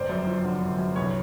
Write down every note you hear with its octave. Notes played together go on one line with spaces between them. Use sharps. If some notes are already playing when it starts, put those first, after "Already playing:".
Already playing: G1 F2 C5 D5
F#2
F3
D3
G1
F#2
C2 B4 C#5